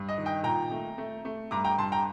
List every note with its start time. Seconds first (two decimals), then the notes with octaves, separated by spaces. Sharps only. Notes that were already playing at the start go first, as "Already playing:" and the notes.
Already playing: G2
0.09 D#5
0.18 D#3
0.26 D#5 G5
0.43 A#2 G5 A#5
0.71 A3
0.98 A3
1.25 A3
1.51 G2 A#5 D6
1.64 G5 A#5
1.78 G2 A5 C6
1.92 G5 A#5